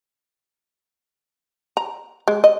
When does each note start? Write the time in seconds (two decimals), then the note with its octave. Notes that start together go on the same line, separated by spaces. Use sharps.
1.77 A#5
2.28 G#3
2.44 D#5